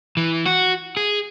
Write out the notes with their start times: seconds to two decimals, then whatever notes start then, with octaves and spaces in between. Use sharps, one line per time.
0.17 E3
0.46 F#4
0.97 G#4